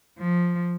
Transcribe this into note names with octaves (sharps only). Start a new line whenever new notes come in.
F3